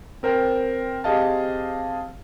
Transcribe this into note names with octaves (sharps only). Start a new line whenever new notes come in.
C4 A#4 C5 G5
C4 G4 G#4 D#5 F5 A5